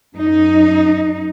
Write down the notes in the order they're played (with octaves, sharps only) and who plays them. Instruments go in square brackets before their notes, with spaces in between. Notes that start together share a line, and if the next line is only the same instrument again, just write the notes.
[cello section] F#2 D#4